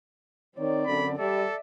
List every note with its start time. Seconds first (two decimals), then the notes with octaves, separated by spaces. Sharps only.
0.57 D#3 C4 C#5 D5
0.86 F#2 D3 B5
1.19 G3 A4 D5 E5